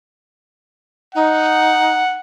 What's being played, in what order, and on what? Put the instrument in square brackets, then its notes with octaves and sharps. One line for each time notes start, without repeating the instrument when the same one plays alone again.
[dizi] D#4 [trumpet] F#5